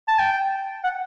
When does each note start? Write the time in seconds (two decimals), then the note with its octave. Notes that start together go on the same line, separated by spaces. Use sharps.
0.08 A5
0.19 G5
0.84 F#5